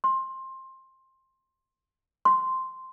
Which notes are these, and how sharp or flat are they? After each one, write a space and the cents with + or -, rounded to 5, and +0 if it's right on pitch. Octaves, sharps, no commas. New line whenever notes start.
C6 +20
C6 -5